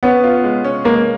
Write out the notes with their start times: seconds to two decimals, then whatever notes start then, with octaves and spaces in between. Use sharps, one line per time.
0.03 B3 C#4
0.24 F4
0.44 G#3
0.64 C#4
0.84 G#3 A#3